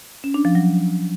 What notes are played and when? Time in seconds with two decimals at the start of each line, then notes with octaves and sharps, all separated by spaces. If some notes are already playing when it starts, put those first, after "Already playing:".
0.24 C#4
0.34 D4
0.45 F3
0.55 F#3